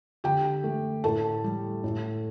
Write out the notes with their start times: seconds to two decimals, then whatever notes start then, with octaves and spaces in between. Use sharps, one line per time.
0.24 D3 G4 G5
0.64 A3
1.04 A2 A4 A5
1.44 G3
1.84 A2